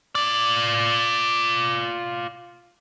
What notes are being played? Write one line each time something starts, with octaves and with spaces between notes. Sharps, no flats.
F4 D5